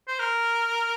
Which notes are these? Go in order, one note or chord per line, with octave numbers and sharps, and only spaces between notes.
C5
A#4